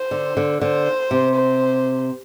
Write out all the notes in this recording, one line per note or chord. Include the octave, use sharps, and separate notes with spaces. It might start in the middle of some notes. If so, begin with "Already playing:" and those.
Already playing: C5
D3
D3
D3 C5
C3
C5